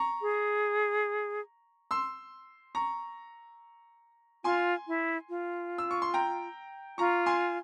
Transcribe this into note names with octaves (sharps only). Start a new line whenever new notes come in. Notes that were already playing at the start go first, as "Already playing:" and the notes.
Already playing: A#5 C#6
G#4
C6 E6
A#5 C#6
F4 G#5 C6
E4
F4
E6
C#6
C6
G5 A#5
F4 A#5 C#6
G#5 C6